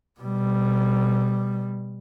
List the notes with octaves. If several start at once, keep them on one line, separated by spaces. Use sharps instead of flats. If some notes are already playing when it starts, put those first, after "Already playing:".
B2 G3